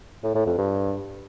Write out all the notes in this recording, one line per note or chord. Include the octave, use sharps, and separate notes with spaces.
A2
A2
F2
G2